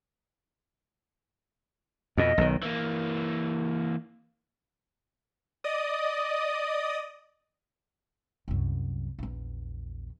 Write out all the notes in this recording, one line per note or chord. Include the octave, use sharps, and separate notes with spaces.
F2 B2 D#5
B1 D#3
E3 A#3
D5 D#5 D#6
C2 F#2
A#1 E2